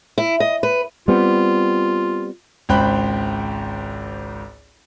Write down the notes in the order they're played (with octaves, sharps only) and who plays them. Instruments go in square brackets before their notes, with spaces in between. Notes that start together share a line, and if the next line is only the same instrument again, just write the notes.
[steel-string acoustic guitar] E4
D#5
B4
[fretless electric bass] G3 B3 C4 [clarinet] F4
[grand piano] G#1 C#2 C5 G5 B5 F#6